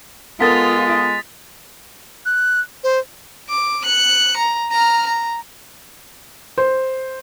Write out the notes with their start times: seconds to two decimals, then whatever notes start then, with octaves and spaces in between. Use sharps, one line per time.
0.40 G#3 B3 F4 A4 A#4 D#6 A6 B6
2.25 F#6
2.83 C5
3.49 D6
3.85 F#6 C#7
4.37 A#5
4.71 A#5 F6
5.07 A#5
6.58 C5